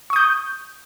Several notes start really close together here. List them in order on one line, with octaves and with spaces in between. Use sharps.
C#6 D#6 G6